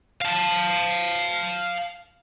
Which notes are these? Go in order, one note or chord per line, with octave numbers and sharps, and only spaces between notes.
F5 A5